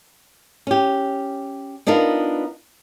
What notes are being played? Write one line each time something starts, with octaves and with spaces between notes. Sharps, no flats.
C#4 G4
B3 D4 D#4 F4 A#4